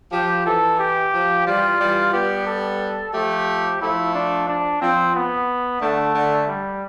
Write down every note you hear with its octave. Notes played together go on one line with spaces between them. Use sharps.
F3 G4
E3 A4
G4
F3
E3 G3 F4
E3 G3
G3 B3 G4
A4
F3 A3 G4
F3 A3 E4
D4
D4
F3 C4
B3
D3 A3
D3
G3